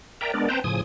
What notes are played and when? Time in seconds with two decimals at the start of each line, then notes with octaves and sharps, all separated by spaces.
0.21 A#4 D5 E5 G5 A#5
0.33 G#3 B3 D4 A#4 D5
0.49 C4 B4 C5 G5 A5 A#5
0.64 A2 C#3 F3 G#5 D#6